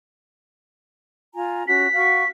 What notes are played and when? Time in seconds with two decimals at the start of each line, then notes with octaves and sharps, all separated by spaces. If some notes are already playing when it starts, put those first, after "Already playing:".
1.35 F4 G#5 A#5
1.67 C#4 F#4 B6
1.95 F#4 F5 C#6